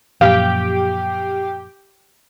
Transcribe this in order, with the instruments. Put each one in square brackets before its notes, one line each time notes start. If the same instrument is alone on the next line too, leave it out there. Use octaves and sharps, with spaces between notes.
[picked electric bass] F#2 A#2 F3 [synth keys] G4 G5 [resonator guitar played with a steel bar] F5